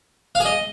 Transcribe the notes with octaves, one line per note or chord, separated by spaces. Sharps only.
F5
G#4
D#5